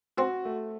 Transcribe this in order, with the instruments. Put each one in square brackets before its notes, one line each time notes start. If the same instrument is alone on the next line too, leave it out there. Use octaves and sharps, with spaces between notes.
[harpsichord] C4 [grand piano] F#4
[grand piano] A3